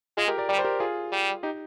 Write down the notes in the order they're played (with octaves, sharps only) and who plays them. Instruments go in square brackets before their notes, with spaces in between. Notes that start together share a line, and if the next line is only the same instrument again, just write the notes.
[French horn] G#3 [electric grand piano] F4 G#4
[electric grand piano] G4 A#4
A#4 D5
[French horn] G3 [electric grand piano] A#4 D5
[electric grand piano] C5
G4 A#4
F4 G#4
[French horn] G3
[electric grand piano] D#4 G4